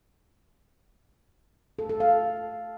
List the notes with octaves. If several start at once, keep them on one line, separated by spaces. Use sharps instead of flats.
A4
A4
F5